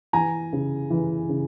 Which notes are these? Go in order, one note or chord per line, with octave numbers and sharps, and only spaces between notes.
E3 G#5 A#5
C#3
E3
C#3